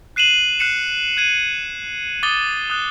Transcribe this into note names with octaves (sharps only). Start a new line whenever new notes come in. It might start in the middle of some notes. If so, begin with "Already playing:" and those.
F#6 C7 D#7 E7 F#7
F#6 C7 C#7 E7
F#6 G#6 D#7
D6 D#6 A6 G7
D#6 F#6